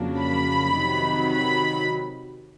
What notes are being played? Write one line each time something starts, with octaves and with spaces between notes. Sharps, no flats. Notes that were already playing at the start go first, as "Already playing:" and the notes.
Already playing: F2 C#3 F#3 A#3 D4
B5
C3 D#3 F#3
B5